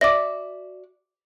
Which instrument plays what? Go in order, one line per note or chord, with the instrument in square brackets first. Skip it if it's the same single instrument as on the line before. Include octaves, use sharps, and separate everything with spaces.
[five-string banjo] F#4 D5 E5 [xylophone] D6 A#6